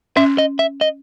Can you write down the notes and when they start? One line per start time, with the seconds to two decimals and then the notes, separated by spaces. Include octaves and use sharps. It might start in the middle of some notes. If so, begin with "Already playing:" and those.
0.17 C#4 E5
0.38 D#5
0.59 E5
0.81 D#5